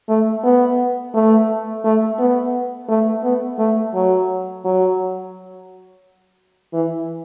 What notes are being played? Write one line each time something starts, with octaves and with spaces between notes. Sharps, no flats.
A3
B3
A3
A3
B3
A3
B3
A3
F#3
F#3
E3